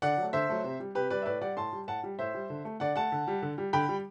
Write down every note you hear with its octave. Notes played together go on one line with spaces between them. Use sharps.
D3 D5 F#5
F#3 A3
D3 C5 E5
F#3 A3
C3
G3
C3 G4 B4
G3 B4 D5
E5
A2 B4 D5
G3 D5 F#5
A2 A5 C6
G3
A2 F#5 A5
G3
A2 C5 E5
G3
D3
A3
D3 D5 F#5
A3 F#5 A5
D3
G3
D3
G3
D3 G5 B5
G3